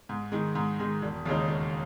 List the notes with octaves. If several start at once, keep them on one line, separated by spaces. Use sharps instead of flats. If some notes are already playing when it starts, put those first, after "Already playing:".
G#2
D#3 G#3
G#2
D#3 G#3
E1
D#2 C#3 G#3 D#4
E1